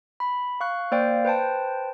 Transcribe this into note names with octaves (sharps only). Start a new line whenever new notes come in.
B5
F5 C#6 F#6
A#3 C5 D5 F5 G5
B4 C5 G5 A5